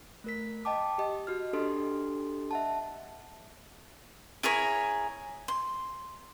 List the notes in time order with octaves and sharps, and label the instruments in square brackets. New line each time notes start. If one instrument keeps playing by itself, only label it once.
[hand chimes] A3 A#4 B6
D#5 G5 A5 D6
G4 D#5
F#4 F6
D4 G4 A4 D#5 C6
E5 F#5 A5
[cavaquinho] E4 G#4 A#4 C#5
C6